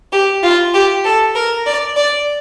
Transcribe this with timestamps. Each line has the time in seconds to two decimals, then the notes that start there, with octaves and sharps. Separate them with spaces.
0.12 G4
0.43 F4
0.74 G4
1.05 A4
1.35 A#4
1.66 D5
1.96 D5